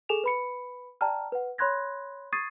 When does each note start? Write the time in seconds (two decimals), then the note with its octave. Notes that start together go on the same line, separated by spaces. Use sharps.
0.09 G#4 A4 G#5 E7 F7
0.24 B4 B5 C#7
1.01 D5 G5 A5 A#5 F6
1.32 B4 F#5
1.58 C#5 B5 C6 F#6 G#6 A#6
2.32 C#6 D#6 G#6 A6 C7 D#7